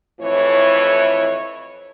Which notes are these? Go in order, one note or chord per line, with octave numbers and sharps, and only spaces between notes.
F2 A2 E3 C#5